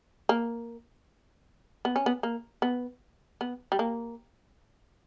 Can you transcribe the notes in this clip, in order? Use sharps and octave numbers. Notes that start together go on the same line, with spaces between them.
A#3
B3
C#4
B3
A#3
B3
B3
G3
A#3